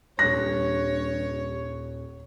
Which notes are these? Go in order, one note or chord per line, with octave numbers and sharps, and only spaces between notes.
D#1 G2 C#5 F#6 A#6